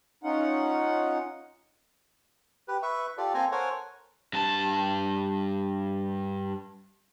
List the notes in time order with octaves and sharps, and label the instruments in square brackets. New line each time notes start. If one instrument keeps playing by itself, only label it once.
[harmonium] C#4 D#4 F4 F#5
[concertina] G4 B4
B4 E5 C#6
F4 G4 A4 D5
A#3 C4 A4 C5 G#5 A#5
A4 A#4 C5 C#5 F#5 G#5
[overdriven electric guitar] G2 A5